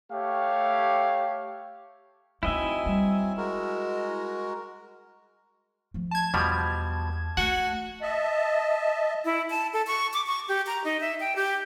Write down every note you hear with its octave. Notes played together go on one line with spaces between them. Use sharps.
A3 G4 C#5 F5
F#3 A3 C4 D#4 E4 D#5 E5 G#5
G3
G#3 F#4 A#4
F3 A3
A5 G#6
E2 B2 F3 G3
A3 F#4 F#5
D#5 E5 A5
E4
A5
A4
C#6
D6
C#6
G4
A#5
D#4
E5
G5
G4